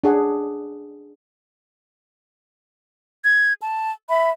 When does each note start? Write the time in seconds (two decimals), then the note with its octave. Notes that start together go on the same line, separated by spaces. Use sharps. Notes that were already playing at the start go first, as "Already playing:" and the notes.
0.04 D4 G#4 F#5
3.22 G#6
3.61 A5
4.09 E5 B5